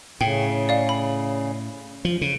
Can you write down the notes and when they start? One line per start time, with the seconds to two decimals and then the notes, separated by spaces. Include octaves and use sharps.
0.21 A2 C#3 G5
0.69 D5 F5
0.89 B5
2.05 F3
2.21 C#3